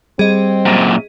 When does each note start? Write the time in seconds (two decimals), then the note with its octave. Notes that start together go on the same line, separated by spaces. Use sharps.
0.19 G3 C4 G#4 D#5
0.66 F#2 A#2